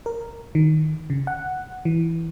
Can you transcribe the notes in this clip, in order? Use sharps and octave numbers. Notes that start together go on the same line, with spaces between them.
A#4
D#3
C#3
F#5
E3